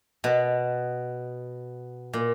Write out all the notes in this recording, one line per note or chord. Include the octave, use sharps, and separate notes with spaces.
B2
A#2